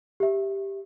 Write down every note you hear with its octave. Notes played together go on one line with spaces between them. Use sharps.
G4 E5